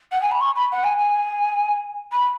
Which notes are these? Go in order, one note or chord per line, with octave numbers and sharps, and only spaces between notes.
F#5
G#5
B5
C#6
B5
F#5
G#5
G#5
B5